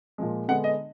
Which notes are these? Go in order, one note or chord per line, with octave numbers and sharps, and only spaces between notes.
A#2 F3 G#3
D3 G#3 B3 F#5
D#5